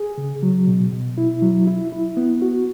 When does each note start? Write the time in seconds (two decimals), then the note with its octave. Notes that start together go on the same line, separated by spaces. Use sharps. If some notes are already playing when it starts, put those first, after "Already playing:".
Already playing: G#4
0.18 C#3
0.43 F#3
0.68 B2
0.93 B2
1.18 E4
1.42 F#3
1.67 E4
1.92 E4
2.17 B3
2.42 F#4